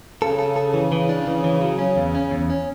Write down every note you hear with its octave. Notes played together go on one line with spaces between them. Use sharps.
C#3 A4
A4
A4
E3
E3
D4
E3
E3
F#3
C#4
E2
C#4
E2
C#4